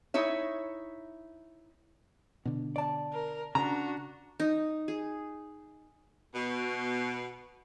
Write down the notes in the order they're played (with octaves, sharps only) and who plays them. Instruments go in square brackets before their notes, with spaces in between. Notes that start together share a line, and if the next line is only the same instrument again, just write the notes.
[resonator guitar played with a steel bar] D#4 E4 C#5 E5
[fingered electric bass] B2 D3
[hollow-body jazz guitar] D5 A5
[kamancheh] A#4
[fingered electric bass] C#3 [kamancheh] D4 F#4 [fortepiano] A#5
[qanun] D#4
G#4
[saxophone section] B2